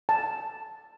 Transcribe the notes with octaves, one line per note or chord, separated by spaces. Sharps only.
A5